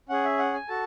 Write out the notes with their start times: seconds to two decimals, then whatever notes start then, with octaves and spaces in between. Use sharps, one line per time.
0.09 C#4 G#4 F#5
0.24 E5
0.38 F#5
0.53 G#5
0.68 F#4 A4 A5